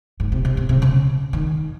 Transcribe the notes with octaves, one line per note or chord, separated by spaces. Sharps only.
G#2
C3
C3
C3
C3
C#3
D#3